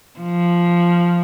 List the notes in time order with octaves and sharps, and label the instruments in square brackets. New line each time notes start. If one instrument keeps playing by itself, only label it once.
[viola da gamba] F3